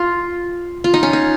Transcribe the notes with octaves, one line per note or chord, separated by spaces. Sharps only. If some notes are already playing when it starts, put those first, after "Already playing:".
Already playing: F4
F4
D#4
C#4
D#4